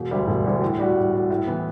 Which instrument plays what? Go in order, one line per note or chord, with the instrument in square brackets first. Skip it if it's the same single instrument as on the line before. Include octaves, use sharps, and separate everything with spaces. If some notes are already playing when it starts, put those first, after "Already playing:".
Already playing: [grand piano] E1
D2 D3 G3
E1
D2 D3 G3
A2
G3 D4 F#4
A2
G3 D4 F#4
A2
E3 B3